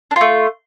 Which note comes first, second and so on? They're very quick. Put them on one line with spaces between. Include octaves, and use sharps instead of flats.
D4 F4 A3